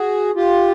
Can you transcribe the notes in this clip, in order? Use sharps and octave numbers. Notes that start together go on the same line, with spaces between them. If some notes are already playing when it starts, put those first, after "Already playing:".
Already playing: F#4 G#4
F4 G4